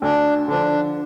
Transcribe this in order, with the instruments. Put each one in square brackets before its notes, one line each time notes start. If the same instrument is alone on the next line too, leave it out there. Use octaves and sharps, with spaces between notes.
[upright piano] D2 [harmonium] D4
[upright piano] D3 F3 [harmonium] D4